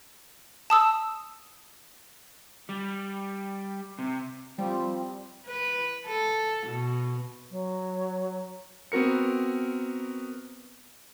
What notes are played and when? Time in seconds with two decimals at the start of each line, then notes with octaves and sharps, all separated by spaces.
0.70 A5 D#6 E6
2.69 G3
3.99 C3
4.58 F3 G3 C4
5.47 B4
6.06 A4
6.67 B2
7.51 F#3
8.92 B3 C4 F#4 A#4 C#7